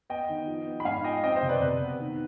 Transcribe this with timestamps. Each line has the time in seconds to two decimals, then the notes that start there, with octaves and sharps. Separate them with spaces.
0.10 B3 D#5 G5
0.29 D#3
0.48 F3
0.67 B3
0.80 B5
0.85 G#2 F5 G#5
1.04 F3 D#5 G5
1.24 C4 D#5 G5
1.36 C5 D#5
1.43 C3
1.49 B4 D5
1.61 C3 B4
1.80 B3
1.99 D#3